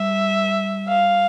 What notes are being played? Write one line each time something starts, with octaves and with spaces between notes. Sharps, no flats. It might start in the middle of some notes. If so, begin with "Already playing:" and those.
Already playing: G3 E5
F5